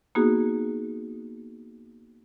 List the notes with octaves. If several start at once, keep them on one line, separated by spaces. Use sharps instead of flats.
A#3 B3 D#4 F#4 G#4